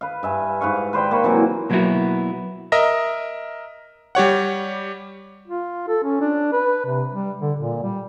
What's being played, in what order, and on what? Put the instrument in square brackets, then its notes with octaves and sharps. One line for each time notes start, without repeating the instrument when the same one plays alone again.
[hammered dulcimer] B4 F5
G2 E5 G#5
G#2 B4 F5 C#6
B4 C5 D5 G5
A#3 B5 C#6
C3 E3 F#3 A#3
[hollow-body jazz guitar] B2 F#3 A#3 B3 E4 F#4
[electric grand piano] A#4 D#5 E5 A#6
G3 G4 C#5 F#5
[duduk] F4
A4
C#4
D4
B4
C3
G3
D3
A#2
G3